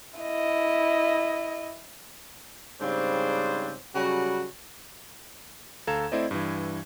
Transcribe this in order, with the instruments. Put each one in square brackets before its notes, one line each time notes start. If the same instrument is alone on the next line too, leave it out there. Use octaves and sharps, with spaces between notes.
[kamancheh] E4 D#5
[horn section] G#2 C#3 G3 C4 D4 C5
C#3 F#3 G3 F#4
[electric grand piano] D2 A4 F5 A#5 G#6 E7
A3 C4 E4 C5 D5 D#5
G2 E3